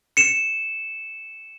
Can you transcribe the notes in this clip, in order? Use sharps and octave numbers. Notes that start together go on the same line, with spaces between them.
C#7 E7